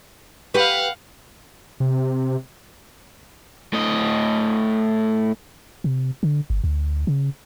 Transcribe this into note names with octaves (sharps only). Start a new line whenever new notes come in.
G4 B4 F5 F#5
C3
A2 D#5
C3
D3
G1
D2
C#3